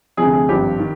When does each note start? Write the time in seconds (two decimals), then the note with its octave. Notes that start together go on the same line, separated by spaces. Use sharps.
0.17 D2 C3 F3 G#4
0.33 G#4
0.49 G#1 G2 F3 G4
0.79 D#3